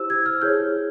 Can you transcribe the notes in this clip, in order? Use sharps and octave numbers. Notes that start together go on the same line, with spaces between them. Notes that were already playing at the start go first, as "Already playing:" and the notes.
Already playing: E4 G4 C5 E6
G#6
F6
E4 G#4 C#5 G6